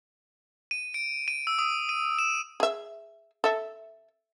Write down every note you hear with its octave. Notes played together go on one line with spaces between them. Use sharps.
D#7
D7
D#7
E6
D#6
D#7
E7
G#4 E5
A4 E5